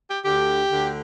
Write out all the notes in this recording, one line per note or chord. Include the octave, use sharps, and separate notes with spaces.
G4
D2 D3 G4
D2 D3